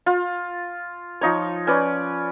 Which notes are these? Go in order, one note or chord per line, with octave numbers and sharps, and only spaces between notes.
F4
F3 D#4 C#5
C#4 B4 D5